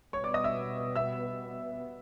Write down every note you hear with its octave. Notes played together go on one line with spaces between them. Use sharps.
B2 G3 B3 C#5 C#6
D5 D6
D#5 D#6
E5 E6
E5 E6